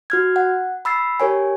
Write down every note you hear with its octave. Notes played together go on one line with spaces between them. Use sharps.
F#4 F6 G#6
F#5
B5 E6 A6 C7
G4 A#4 C#5 G#5